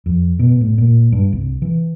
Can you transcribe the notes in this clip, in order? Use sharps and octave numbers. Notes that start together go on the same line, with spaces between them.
F2
B2
A2
A#2
G2
C2
E3